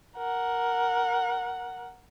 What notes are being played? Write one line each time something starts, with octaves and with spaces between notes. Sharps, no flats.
A#4 F#5